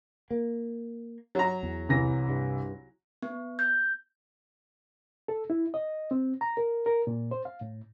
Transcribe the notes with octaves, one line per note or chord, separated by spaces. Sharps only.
A#3
F#3 A#5
E2
C2 E3 A#6
G2
B3
G6
A4
E4
D#5
C4
A#5
A#4
A#4
A#2
C5
F5
A2